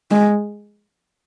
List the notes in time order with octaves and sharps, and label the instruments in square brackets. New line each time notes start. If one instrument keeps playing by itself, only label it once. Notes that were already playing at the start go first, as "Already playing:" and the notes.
[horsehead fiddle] G#3